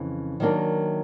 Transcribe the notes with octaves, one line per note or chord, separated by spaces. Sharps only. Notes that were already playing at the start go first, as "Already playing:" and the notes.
Already playing: F2 C#3 E3
D#3 F#3 A#3 D4